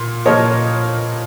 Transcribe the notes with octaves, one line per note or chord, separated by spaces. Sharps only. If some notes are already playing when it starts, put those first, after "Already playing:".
Already playing: A#2
A#2 F3 A#3 C#5 D#5